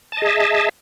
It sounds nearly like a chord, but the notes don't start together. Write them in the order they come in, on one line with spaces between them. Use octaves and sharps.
A5 D#5 G#4 E5